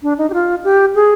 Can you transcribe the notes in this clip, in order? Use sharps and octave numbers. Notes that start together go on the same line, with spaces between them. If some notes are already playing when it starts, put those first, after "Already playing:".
D4
D#4
G4
F4
G4
G#4